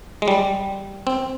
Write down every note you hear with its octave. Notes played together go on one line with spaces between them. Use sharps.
G#3
G3
C4